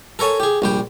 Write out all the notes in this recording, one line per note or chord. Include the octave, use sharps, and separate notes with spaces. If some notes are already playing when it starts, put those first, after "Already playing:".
A4 A#4 C#5 G#5 A5
G4 G#4
A#1 G3 G5